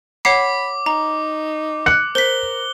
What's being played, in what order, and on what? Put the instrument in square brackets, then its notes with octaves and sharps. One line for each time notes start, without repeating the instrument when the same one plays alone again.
[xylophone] C#5 F#5 C7 [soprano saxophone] B5 [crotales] D6
[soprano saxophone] D#4 [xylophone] A#5
[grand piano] F#6 C#7
[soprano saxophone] A#4 [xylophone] C5 B6 [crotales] G7